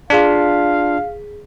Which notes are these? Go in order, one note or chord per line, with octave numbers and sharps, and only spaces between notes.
D4 F4 G#4 F5 B6